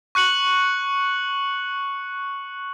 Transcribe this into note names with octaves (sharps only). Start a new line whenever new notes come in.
C#6 F#6 C#7 F#7